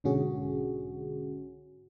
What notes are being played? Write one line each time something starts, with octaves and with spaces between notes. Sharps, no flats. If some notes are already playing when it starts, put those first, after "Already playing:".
B1 G#2 D3 C#4 F#4 G#4